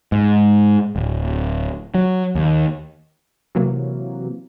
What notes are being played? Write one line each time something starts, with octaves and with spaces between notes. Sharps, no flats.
G#2
D1
F#3
D#2
C3 E3 F#3 A#3